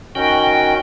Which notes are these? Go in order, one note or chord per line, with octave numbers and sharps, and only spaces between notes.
D#3 C#4 F#4 G5